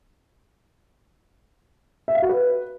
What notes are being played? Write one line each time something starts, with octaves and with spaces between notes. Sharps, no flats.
E5
F5
F#4
B4